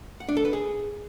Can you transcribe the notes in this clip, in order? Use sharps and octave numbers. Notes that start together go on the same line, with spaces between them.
F#5
D4
A4
B4
G#4